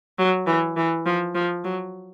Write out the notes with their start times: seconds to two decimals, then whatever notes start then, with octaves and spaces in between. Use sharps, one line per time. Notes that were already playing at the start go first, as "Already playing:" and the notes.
0.19 F#3
0.47 E3
0.77 E3
1.05 F3
1.35 F3
1.64 F#3